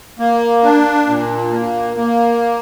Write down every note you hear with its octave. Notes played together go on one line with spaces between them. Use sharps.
A#3
D4
A#2
A#3
A#3